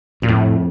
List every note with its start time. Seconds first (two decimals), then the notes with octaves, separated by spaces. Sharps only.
0.22 F#2 A#2
0.28 F2 A2